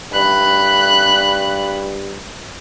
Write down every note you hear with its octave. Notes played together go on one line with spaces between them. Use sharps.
G2 B5 F#6